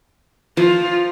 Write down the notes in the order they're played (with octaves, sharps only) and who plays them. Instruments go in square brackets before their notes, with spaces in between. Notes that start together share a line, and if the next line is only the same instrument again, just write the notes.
[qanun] F3 [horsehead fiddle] F4